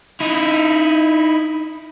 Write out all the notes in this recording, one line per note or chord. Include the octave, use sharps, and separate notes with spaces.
D#4 E4